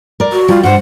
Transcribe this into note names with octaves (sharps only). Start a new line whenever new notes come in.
A#4 D5
F#4
G3 F4
G2 C5 F#5